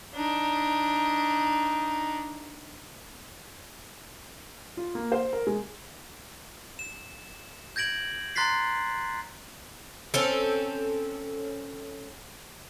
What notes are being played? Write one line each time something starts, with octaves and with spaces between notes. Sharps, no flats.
D4 D#4
F4
A#3
C5
A#4
G#3
E7
G6 G#6 A#6 D7 F#7
A#5 C6 F#6 A6 B6 C7
C4 C#4 A4